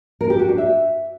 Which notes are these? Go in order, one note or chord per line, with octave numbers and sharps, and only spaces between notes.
A#4
G4
F#4
D4
E5